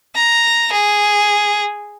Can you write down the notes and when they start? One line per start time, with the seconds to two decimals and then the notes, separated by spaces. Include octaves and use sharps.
0.15 A#5
0.72 G#4